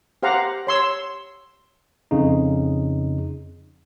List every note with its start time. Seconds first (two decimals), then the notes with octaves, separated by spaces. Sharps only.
0.23 G4 C5 F5 F#5 A#5
0.67 C#5 C6 E6
2.11 F2 C#3 D#4